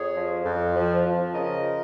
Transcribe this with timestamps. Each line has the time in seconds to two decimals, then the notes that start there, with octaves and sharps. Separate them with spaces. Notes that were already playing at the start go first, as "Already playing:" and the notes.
Already playing: F2 G#4 C#5
0.15 F3
0.45 F2
0.75 F3
1.05 F3
1.34 C#3 A#4 D#5